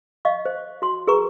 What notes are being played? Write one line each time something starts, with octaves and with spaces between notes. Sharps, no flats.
D#5 F5 C#6
C5
F#4 C6
G#4 A#4 B4 A#5 C#6